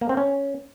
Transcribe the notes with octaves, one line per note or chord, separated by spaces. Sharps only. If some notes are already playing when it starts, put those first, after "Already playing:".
A#3
C4
C#4